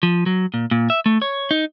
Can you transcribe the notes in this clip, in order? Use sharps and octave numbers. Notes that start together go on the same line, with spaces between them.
F3
F#3
A#2
A#2
E5
A3
C#5
D#4